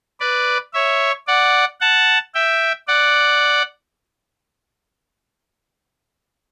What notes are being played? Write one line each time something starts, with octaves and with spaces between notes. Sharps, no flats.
B4 D5
C#5 E5
D5 F#5
F#5 A5
E5 G5
D5 F#5